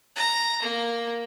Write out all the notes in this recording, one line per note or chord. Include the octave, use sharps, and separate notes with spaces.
A#5
A#3